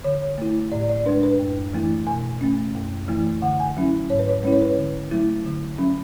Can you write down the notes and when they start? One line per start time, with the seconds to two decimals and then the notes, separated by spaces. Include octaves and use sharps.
0.04 D3 C#5
0.38 A3 E4
0.72 A2 D5
0.89 D5
1.06 G#3 D4 B4
1.23 B4
1.40 F#2
1.74 E3 A3 E4
2.07 B2 G#5
2.41 A3 C#4
2.75 F#2
3.08 E3 A3 E4
3.42 D3 F#5
3.60 G#5
3.77 F#3 C#4 E4
4.10 G#2 C#5
4.19 B4
4.29 C#5
4.43 G#3 C#4 E4 B4
4.52 C#5
4.62 B4
4.77 D3
5.11 F#3 A3 E4
5.45 D3
5.78 F#3 C#4